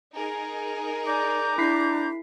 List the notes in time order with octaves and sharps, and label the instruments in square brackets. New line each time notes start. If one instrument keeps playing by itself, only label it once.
[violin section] D#4 G#4 A#4
[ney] D5 [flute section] A#5 D6 G6
[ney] D4 [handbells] E4 B6 C7